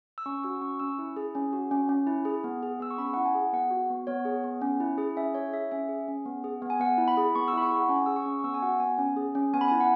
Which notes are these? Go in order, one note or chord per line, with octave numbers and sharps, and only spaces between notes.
E6
C#4 C#6
F#4 E6
C#4 C#6
C#4 E6
E4
G#4
C#4
F#4
C#4
C#4
E4
G#4
B3
G#4
B3 E6
C#6
C#4 B5
E4 F#5
G#5
G#4
B3 F#5
F#4
B3
B3 C#5
G#4
B3
C#4
E4
G#4
C#4 E5
E4 C#5
G#4 E5
C#4 E5
G#4
C#4
B3
G#4
B3
G#5
B3 F#5
E4
B5
G#4
B3 C#6
E6
E4 B5
C#6
G#4 F#5
C#4 G#5
G#4 E6
C#6
C#4
C#6
B3 E6
G#5
F#4 F#5
B3 G#5
C#4
G#4
C#4
B3 G#5
B5
G#5
E4
F#5